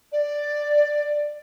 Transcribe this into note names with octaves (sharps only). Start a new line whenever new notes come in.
D5